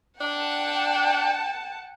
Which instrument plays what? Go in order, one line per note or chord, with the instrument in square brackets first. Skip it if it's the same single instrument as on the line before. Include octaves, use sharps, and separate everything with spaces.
[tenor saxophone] D4 [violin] F#5 A5 [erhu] G5